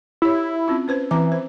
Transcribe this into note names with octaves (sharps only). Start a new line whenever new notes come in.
E4 G4 C#5
C4 C#4 F4
C#4 B4 C5
E3 C4 A#5 D6
C5